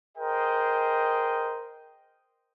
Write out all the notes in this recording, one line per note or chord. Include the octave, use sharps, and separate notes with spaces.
G#4 A#4 C5 D#5 G5